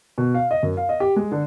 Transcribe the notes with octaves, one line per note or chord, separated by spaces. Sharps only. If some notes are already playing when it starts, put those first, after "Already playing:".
B2
F5
D#5
F#2
F5
D#5
G4
G#3
D3